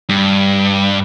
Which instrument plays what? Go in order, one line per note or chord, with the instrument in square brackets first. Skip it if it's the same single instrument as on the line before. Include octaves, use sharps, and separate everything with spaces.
[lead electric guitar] G2